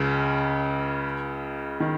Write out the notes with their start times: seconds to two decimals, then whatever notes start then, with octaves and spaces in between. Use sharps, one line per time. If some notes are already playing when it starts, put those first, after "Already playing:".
Already playing: C#2 C#3
1.80 D#3